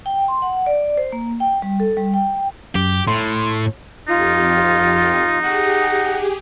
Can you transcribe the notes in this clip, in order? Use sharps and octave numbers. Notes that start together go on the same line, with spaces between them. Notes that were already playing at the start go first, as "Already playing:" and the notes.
G5
C6
F#5
D5
C5
A#3
G5
G3
A4
G3
G5
F#2 G4
A2 C6
F2 D#4 F4 G4
G4 G#4 F#5